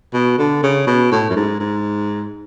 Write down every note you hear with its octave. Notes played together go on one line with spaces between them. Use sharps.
B2
D3
C#3
B2
A2
F#2
G#2
G#2